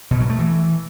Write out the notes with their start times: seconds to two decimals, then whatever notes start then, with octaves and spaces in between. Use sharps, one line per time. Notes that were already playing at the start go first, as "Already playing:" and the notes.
0.11 B2
0.20 F#3
0.30 A3
0.39 E3